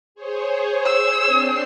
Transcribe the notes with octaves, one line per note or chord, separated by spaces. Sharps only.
G#4 C5 C#5
E6
C4 D4 C7